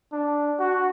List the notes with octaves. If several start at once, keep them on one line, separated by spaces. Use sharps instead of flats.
D4
F#4